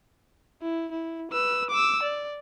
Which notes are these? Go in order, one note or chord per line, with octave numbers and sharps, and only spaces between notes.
E4
E4
B4 E6
D6 E6
D5